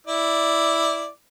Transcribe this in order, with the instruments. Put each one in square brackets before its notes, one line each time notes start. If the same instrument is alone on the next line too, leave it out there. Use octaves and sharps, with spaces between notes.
[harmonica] E4 D5